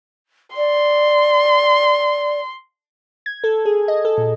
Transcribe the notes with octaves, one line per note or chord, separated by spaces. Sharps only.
D5 C6
G#6
A4
G#4
D#5
A4
A#2